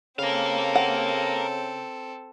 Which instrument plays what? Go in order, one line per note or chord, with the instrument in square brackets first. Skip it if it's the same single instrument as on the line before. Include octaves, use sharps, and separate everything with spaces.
[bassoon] C#3 [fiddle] C4 A4 [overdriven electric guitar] A#4 F5
[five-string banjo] F#5